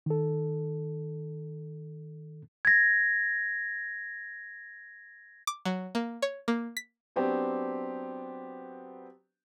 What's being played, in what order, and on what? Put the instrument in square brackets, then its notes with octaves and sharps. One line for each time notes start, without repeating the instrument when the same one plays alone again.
[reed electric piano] D#3 A4
[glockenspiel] G#6 A#6
[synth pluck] D6
F#3
A#3
C#5
A#3
B6
[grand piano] F#3 B3 C4 D4 G4